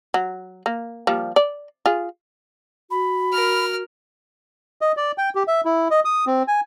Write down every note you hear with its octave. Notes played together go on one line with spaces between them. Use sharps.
F#3
A#3
F3 G3 A#3
D5
F4 G#4
F#4 B5
A#4 F6
D#5
D5
G5
G4
E5
E4
D#5
D#6
C4
G#5